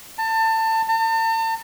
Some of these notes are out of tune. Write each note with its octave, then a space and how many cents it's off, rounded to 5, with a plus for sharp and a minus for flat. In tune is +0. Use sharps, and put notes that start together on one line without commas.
A5 +25
A5 +40